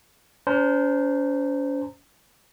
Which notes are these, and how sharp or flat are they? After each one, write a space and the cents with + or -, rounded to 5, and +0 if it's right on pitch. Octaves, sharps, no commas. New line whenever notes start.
C#4 +45 C5 -20 A#5 -25